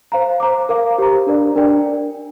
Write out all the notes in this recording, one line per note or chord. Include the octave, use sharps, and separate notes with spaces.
C5 F5 A#5
C5 A#5 D6
A#4 F5 D6
G4 C5 A#5
D4 A#4 D5
D4 A#4 D5 G5